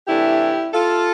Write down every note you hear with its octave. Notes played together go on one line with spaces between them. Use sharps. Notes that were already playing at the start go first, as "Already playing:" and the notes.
C3 E3 A3 D4 E4 G4
F4 A4